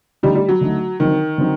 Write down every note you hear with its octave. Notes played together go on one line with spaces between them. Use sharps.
D3 G3 A3 D#4
G3
F#3
D3 A3 D#4
D3 D#3 F#3 C4 D#4
D3 F#3 C4 D#4